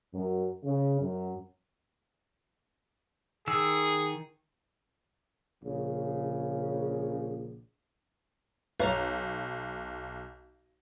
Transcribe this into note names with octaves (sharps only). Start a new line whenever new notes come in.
F#2
C#3
F#2
D#3 G#4 E6
A#1 C#3
B1 B4 C#5 A#5